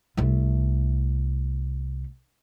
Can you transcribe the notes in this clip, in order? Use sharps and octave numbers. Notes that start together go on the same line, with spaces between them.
C2 A3